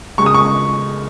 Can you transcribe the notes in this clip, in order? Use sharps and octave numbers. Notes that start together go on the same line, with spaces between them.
C#3 G#3 C#6
D#6
C#6